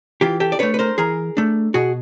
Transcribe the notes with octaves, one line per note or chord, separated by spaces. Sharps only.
E3 F4 G4
G4 A4
D5
A3 D4 B4 C#5
B4
A#4 C5
E3 G#4 A#4
A3 D4
B2 F#4 G#4